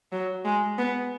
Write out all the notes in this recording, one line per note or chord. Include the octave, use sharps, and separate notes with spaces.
F#3
G#3
B3